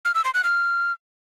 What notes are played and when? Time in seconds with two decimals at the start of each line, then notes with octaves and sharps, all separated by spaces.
0.05 F6
0.15 E6
0.25 C6
0.34 F#6
0.44 F6